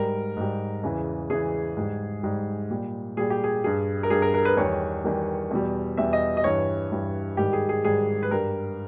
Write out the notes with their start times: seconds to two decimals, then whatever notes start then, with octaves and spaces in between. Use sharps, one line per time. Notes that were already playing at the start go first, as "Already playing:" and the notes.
Already playing: G#2 G3 A#4
0.37 G#2 G3
0.83 E2 C#3 E3
1.30 E2 C#3 E3 G#4
1.77 G#2 G3
2.23 G#2 G3
2.71 A#2 G3
3.17 A#2 G3 G#4
3.30 G4
3.44 G#4
3.64 G2 G3 G#4
4.03 A#4
4.10 G2 G3 G#4
4.22 A#4
4.34 A#4
4.45 B4
4.57 E2 D#3 G3 C#5
5.04 E2 D#3 G3
5.51 E2 B2 G3
5.97 E2 B2 G3 E5
6.13 D#5
6.37 D#5
6.44 G2 E3 G3 C#5
6.91 G2 E3 G3
7.37 G#2 D#3 G3 G4
7.53 G#4
7.69 G#4
7.84 G#2 D#3 G3 G#4
8.23 B4
8.31 G2 G3 A#4